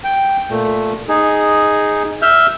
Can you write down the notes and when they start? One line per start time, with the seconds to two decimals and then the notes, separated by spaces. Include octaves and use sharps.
0.04 G5
0.50 A#2 A3
1.09 D#4 G#4
2.22 E5 F6 G6